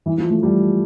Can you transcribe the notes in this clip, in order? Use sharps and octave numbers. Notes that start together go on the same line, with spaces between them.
E3
F3
A3
G3